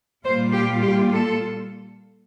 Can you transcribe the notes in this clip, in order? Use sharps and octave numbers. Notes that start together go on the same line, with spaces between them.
A#2 G3 A#3 F4 C5
G4
G4
A4